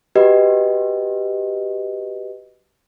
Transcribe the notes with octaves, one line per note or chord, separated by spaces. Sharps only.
F#4 G4 B4 D#5